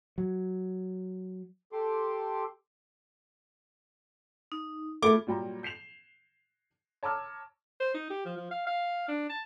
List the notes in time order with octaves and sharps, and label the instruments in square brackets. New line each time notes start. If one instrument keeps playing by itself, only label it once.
[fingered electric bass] F#3
[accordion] G4 A4 C6 D6
[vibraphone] D#4
[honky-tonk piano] A3 [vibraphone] B3 F4 G#4 [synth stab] D6
[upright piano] A#2 F#3 G3 G5 A#5
G6 C7 E7 F7
C#5 A5 A#5 D6 E6 F6
[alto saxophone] C5
D#4
G4
F3
F3
F5
F5
D4
A5